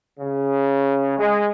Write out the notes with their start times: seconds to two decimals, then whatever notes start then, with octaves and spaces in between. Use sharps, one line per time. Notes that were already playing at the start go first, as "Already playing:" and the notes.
0.20 C#3
1.18 G#3